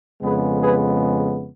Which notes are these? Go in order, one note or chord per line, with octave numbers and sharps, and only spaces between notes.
F2 C#3 G#3 B3 G#4 B4
G#4 B4